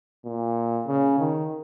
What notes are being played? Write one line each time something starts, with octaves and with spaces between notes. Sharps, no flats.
A#2
C#3
D#3